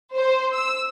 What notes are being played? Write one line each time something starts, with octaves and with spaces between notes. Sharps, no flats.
C5
E6